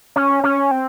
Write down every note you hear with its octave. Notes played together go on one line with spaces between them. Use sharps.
C#4
C#4
C4